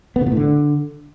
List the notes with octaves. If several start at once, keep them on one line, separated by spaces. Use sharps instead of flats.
B3
C#3
A#2
A2
D3